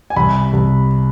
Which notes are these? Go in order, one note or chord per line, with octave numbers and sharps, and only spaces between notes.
G#5
C2 B5
C2